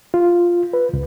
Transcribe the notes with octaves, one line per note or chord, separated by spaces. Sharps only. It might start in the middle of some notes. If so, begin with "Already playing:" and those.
F4
B4
C#2